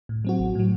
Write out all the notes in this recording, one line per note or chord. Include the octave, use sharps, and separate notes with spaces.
A2
F#3 C4 F#4
A1
A2 F#3